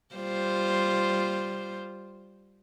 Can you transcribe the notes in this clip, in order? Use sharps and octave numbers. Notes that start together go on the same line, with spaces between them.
G3 F4 C5